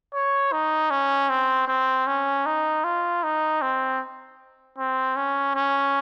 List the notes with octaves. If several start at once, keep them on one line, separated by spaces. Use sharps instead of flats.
C#5
D#4
C#4
C4
C4
C#4
D#4
F4
D#4
C4
C4
C#4
C#4